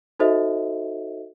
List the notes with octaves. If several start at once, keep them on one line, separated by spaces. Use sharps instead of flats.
D#4 F#4 A4 C5 D#5 E5